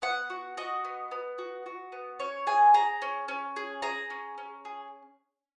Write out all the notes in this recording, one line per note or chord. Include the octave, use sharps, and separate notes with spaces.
B3 F#5
F#4
F#4 D#5
B3
B3
F#4
F#4
B3
C#4 C#5
G#4 G#5
G#4 A#5
C#4
C#4
G#4
G#4 A#5
C#4
C#4
G#4